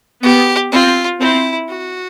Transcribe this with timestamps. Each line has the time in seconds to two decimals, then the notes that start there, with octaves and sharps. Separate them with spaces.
0.23 B3 G4
0.72 C4 F4
1.20 C4 E4
1.69 F#4